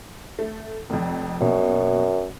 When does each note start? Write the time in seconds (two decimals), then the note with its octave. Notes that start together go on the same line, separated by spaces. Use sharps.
0.39 A3
0.90 F1 F2
1.40 A#1 F#2 B2